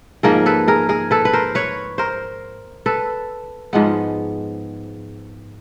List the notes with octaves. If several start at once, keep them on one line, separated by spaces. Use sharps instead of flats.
G#2 F3 A#3 G#4 A#4
A4 B4
G#4 A#4
G#4 A#4
A4 B4
B4
A#4 C5
B4 C#5
A#4 C5
A4 B4
G#2 F3 G#3 B3